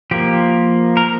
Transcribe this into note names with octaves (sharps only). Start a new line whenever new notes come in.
F3 A#3 G4
A#4